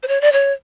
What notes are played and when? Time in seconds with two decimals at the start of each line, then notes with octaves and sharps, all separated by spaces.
0.03 C5
0.08 C#5
0.21 D5
0.33 C#5